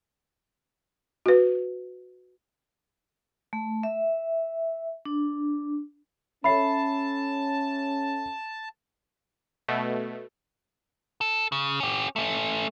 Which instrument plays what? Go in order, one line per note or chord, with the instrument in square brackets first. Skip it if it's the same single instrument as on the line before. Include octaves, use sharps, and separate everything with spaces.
[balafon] F#4 B4
[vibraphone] A3
E5
D4
[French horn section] C#4 [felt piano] A4 C#5 E5 [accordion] A5 [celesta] B5 C7
[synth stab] B2 A3
[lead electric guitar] A4
C#3
C#4 G4
A3 C#4